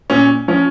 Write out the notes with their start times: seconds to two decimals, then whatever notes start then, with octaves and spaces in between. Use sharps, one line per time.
0.10 A#2 C#4
0.48 F3 C#4